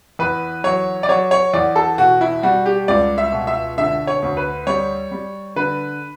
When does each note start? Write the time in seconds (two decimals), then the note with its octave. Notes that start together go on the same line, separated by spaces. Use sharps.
0.19 E2 B4
0.64 F#3 C#5
1.03 D5
1.09 F#3 C#5
1.31 C#5
1.53 E2 D5
1.76 A4
1.98 B2 F#4
2.21 E4
2.43 G3 F#4
2.66 G4
2.88 C#2 D5
3.18 E5
3.32 B2
3.47 E5
3.78 D3 E5
4.07 C#5
4.22 D2
4.37 B4
4.67 G3 C#5
5.12 G3
5.56 D3 B4